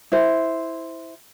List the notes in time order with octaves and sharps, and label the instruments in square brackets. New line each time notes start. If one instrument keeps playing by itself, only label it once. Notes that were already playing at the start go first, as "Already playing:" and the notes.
[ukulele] E4 C5